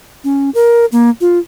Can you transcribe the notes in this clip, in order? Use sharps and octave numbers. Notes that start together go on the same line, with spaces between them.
C#4
A#4
A#3
F4